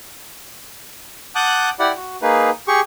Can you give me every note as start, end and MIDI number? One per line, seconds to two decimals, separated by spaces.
1.35 1.70 78
1.35 1.70 81
1.35 1.70 86
1.35 1.70 87
1.35 1.70 90
1.35 1.70 91
1.79 1.92 64
1.79 1.92 67
1.79 1.92 74
1.79 1.92 78
1.97 2.17 66
2.22 2.50 58
2.22 2.50 63
2.22 2.50 68
2.22 2.50 71
2.68 2.80 67
2.68 2.80 68
2.68 2.80 85